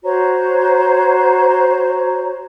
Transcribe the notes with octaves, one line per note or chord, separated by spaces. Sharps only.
F#4 C5 C#5 A#5